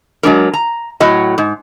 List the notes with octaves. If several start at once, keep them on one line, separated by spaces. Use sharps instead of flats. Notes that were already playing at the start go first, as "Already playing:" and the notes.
F#3 G#3 D4 A#4
A#5
A2 F#3 F#4 D#5
G#2